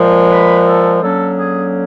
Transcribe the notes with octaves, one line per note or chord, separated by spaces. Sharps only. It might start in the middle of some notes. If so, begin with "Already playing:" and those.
Already playing: A#2 F3 G#3
B4
A4
D3 F#3 A#3 C#4 A4
G#4